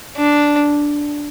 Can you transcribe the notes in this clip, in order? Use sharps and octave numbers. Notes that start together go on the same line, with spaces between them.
D4